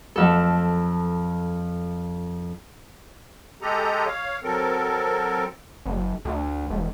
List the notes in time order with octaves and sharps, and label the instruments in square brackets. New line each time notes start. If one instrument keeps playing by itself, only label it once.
[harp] F2 A4
[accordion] G#3 G4 A4 D#5 A#5
C#5 F5
F#3 C4 A4 A#4
[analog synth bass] F#1
D2
E1